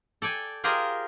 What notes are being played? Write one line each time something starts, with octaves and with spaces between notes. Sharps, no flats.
A4 D5 G5 G#5
F4 G4 G#4 A#4 C5 D#5